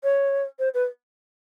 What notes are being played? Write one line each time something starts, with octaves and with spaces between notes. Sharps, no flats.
C#5
C5
B4